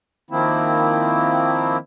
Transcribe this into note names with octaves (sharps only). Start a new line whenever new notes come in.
D#3 F3 A#3 C4 E4